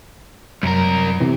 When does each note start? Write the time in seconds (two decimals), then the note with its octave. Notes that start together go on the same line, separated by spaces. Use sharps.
0.63 C2 F#2 A#4
1.20 C2 C3 E3